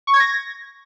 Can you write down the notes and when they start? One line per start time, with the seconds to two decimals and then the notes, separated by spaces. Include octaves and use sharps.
0.07 C#6
0.14 G#6
0.20 A#6